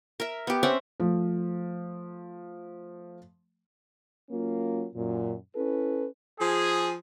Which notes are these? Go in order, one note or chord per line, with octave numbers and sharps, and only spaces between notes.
A#4 E5
B3 G4
C4 C#4 E5 F#5
F3 A3
F#3 A#3 C#4 F4
F#2 A#2
C#4 E4 A4 B4
F3 G#4